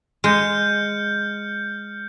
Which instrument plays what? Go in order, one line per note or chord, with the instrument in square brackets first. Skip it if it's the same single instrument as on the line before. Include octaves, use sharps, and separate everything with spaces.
[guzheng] G#3 [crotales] F6 G6 C#7